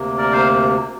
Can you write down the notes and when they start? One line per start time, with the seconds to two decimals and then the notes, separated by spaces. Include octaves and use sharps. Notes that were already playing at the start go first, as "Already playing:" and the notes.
Already playing: D2 C3 A#3
0.18 A#4 D5
0.33 C5 F5